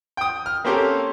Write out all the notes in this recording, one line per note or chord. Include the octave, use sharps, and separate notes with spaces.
G5 D#6
F6
A#3 C4 C#4 G4 A4 A#4